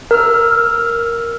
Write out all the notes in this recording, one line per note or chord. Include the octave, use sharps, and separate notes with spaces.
A#4 E6 F6